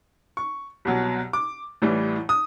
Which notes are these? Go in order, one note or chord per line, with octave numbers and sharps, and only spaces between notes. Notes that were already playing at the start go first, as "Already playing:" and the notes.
C#6
C2 B2 F#3
D6
A1 A2 E3 G3
D#6